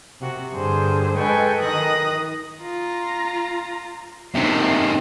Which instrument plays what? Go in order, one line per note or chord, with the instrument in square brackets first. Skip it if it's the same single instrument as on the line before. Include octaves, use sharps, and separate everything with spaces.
[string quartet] C3 F#4
G2 D3 G#4 C5
G#3 A4 B4 G5 G#5 C#6
D#3 D#6 F#6 A#6
[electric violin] F4 A#5
[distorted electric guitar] C3 D#3 [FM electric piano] C4 E5 [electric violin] C7